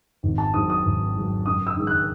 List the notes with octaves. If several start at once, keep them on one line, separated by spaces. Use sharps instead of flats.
G#1
A5
G#2 F#3 D#6
D#6
G#1
G#2 F#3
F#2 D#6
E6
D#3 G#3
F#6